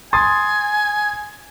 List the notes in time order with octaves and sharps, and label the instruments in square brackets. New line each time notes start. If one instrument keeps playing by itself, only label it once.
[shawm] G#5 [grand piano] C6 D#6 A6